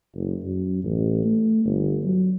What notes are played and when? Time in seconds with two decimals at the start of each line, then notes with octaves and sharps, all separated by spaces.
0.14 F#1
0.44 F#2
0.83 A1
1.25 A3
1.65 G1
2.04 F#3